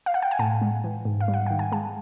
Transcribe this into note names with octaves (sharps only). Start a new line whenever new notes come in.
F5
F#5
G5
G#5
A2 A5
G#3
E3
G#2
F5
G3
F#5
D#3 G5
G#5
G#3 A5